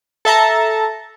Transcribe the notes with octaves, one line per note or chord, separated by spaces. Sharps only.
A4 E5 A5 A#5